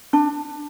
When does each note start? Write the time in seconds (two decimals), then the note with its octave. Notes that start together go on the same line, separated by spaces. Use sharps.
0.13 D4